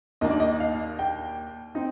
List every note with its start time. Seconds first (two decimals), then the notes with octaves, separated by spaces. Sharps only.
0.21 D#2 D#3 A#3 D4 D#5
0.31 D5
0.40 D#5
0.60 F5
0.99 G5
1.75 C4 D#4